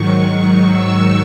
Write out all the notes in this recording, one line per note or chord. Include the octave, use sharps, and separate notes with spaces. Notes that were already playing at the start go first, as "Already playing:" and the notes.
Already playing: G#2 D#3 F#3 C#6
E6